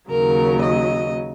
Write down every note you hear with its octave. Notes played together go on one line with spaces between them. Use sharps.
D#2 C#3 F#3 A#4
D#5